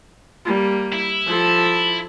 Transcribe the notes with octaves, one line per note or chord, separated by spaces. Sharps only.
G3 A#3
E4
F3 A4